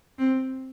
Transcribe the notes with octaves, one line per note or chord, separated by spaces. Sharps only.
C4